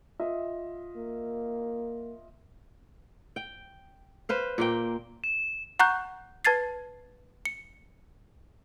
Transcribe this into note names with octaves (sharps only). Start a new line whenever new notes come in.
F4 D#5 E5
A#3
G5
B4 C5 F5
A#2 A#3 G5
E7
F#5 A#5 C#6 F#6 G6
B4 A5 G#6 A6 C7
C#7